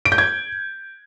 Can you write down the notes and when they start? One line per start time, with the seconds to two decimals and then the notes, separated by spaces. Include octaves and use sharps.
0.05 D7
0.12 G6
0.18 G#6